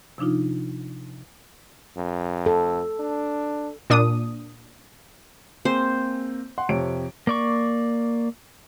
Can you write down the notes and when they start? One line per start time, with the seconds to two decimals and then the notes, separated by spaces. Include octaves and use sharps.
0.18 C3 F3 D4 D#4 F4
1.97 F2
2.46 A4
3.00 D4
3.90 A#2 D4 D#6
5.65 A#3 C4 G#4 C5
6.58 F#5 C6
6.69 F2 C3 C#5 D7
7.27 A#3 D5 C#6